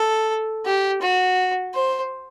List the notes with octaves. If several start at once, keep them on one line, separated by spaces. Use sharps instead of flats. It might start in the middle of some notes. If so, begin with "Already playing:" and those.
Already playing: A4
G4
F#4
C5